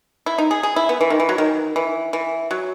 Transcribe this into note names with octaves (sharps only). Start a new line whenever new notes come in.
E4
D#4
G#4
G#4
E4
B3
E3
D#3
E3
F#3
D#3
E3
E3
F#3